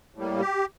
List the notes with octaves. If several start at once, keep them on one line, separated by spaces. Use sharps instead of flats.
A2 G3 A#3
G4